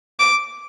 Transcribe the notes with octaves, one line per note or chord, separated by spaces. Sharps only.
D6